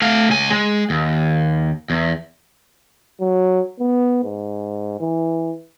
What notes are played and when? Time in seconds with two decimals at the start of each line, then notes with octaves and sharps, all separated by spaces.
0.02 A3 F5
0.29 C#2 G#5
0.51 G#3
0.90 D#2
1.90 E2
3.20 F#3
3.80 B3
4.24 G#2
5.00 E3